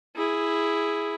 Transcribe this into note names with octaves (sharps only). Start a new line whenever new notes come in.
E4 G#4